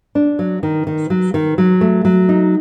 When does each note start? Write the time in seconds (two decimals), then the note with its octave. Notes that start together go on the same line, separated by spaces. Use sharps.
0.15 D4
0.39 F#3
0.63 D#3
0.87 D#3
1.10 F#3
1.34 D#3
1.58 F#3
1.81 A3
2.05 F#3
2.29 D#4